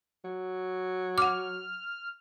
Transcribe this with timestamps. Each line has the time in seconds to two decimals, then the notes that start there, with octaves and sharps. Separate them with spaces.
0.25 F#3
1.18 F#5 D6 F6